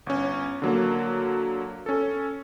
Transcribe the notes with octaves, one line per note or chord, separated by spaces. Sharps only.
G1 C#4
D3 F#3 A#3
C#4 A4